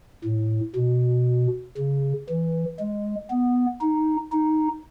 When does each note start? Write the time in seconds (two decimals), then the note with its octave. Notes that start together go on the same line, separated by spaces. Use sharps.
0.25 A2
0.76 B2
1.78 C#3
2.29 E3
2.79 G#3
3.30 B3
3.81 D#4
4.33 D#4